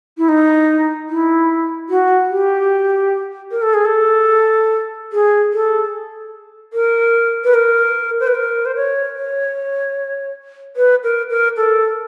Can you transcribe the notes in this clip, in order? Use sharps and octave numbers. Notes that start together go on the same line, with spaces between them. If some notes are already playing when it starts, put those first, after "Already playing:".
E4
D#4
E4
F#4
G4
A#4
A4
G#4
A4
G#4
A4
A#4
B4
A#4
C5
B4
A#4
C5
C#5
C#5
B4
A#4
A#4
A4